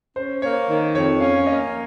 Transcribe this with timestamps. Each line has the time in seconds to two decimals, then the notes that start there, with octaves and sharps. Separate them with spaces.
0.16 C#4 C5
0.42 A#3 C#5
0.69 D#3
0.95 F2 C#5
1.20 C#4 F5
1.46 A#3 D#5